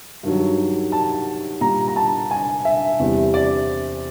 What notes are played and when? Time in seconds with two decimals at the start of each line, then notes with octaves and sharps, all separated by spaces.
0.23 G2 D#3 F#3
0.92 A5
1.61 A#2 G3 A#5
1.88 A#5
1.96 A5
2.31 G#5
2.65 E5
2.99 E2 C3 E3 G3
3.34 D5